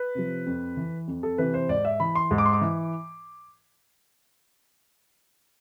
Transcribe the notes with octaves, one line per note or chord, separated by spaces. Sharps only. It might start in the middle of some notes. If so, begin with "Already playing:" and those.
Already playing: B4
C3 F3
F2
E3
F2
A4
C3 E3 B4
C5
G#2 D5
E5
E3 B5
C6
G#2
D6
C6
D6
E3